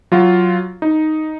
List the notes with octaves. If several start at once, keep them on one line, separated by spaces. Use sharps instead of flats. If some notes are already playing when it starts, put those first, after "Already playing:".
F#3 F4
D#4